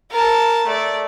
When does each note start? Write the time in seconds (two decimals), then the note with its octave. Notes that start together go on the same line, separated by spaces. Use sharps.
0.11 A#4 A5
0.66 A3 D5